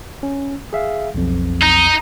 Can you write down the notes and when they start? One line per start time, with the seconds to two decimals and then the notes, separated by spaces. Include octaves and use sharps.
0.23 C#4
0.73 G#4 E5 F5
1.15 B1 F2
1.63 D#4